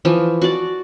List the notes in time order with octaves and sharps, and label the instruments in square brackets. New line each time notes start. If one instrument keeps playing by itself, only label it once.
[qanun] E3 F3
F#4 D5